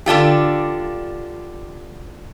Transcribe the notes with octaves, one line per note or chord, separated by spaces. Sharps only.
D3 D4 F4 G4